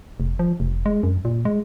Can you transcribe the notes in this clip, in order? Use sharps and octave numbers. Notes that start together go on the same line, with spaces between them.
F1
F3
F1
G#3
F#2
A#2
G#3